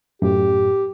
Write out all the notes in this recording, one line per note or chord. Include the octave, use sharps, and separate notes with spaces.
F#2 A2 G4